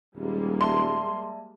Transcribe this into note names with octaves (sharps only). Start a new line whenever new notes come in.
D#1 G3 G#3 A#3
D5 E5 A5 C6